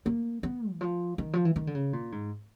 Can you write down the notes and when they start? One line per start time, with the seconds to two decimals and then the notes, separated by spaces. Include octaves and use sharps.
0.06 A#3
0.43 B3
0.71 E3
0.81 F3
1.18 D#3
1.33 F3
1.45 E3
1.56 D#3
1.67 D3
1.75 C#3
1.93 A#2
2.12 G#2